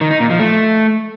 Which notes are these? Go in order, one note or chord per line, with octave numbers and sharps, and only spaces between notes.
D#3
D#4
A#2
F3
A3